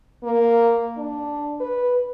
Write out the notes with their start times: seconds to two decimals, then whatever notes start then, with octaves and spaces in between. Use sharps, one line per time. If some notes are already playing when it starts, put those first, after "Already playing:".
0.24 A#3
0.98 D4
1.60 B4